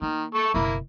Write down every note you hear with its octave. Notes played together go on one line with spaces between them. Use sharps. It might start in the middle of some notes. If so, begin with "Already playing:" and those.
D#3 A#3
A4 A5 C#6
F#1 B2 A#3 E4